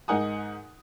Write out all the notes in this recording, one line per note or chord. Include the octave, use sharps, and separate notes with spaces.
G#2 D#4 A#4 F#5 G#5 D#6